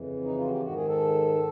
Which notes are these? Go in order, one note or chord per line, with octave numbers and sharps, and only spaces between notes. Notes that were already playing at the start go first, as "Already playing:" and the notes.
Already playing: F2 C#3 E3
D#4
F4
F#4
G4
G#2 D#3 F#4
G#4
A4